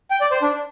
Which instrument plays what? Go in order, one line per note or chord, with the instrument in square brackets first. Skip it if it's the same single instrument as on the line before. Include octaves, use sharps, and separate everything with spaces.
[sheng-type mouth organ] G5
D5
C5
D4